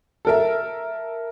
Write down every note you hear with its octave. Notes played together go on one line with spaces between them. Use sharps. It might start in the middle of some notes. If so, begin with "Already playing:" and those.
A4 A#4 E5